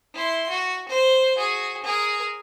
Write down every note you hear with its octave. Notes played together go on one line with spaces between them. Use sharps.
E4 C6
F#4
C5
F#4 G#4
G#4 A#4